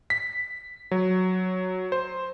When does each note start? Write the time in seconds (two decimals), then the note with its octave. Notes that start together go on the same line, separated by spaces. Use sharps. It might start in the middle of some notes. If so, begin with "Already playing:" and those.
0.10 B6
0.91 F#3
1.92 C5